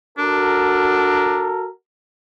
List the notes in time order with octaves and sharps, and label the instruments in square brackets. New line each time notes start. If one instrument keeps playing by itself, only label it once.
[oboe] D4 [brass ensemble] F#4 A4 A#4